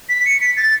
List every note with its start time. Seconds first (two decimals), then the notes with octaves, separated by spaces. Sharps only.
0.09 B6
0.26 C#7
0.41 B6
0.57 A6